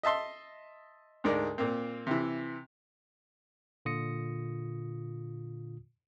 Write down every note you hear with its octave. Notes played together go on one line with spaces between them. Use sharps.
D#5 E5 A5 C6
D2 G#2 G#3 A#4 D5
A#2 A#3 C4
C3 E3
A#2 D3 F4 D#6 A#6 C#7